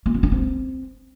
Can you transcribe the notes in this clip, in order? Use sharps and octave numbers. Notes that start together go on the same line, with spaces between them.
A#3
C4
D4
C4